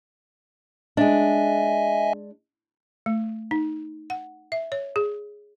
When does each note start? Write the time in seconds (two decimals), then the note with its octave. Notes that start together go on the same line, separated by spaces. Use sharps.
0.97 G#3 D4 D#5 E5 G#5
3.06 A3
3.51 D#4
4.10 F#5
4.52 E5
4.72 C#5
4.96 G#4